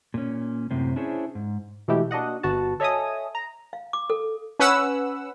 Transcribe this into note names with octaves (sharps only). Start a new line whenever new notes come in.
A#2 C#4
F#2 A2 C3 C4
C#4 D4 E4 G#4 C5 C#5
G#2
B2 E3 G#3 A3 E4 G4
A#3 D4 F#4 D#5 F#5
G1 B3 F#4 A5
A4 C#5 D#5 E5 G#5 D#6
A#5
F5
D6
A4
C#4 B4 F#5 E6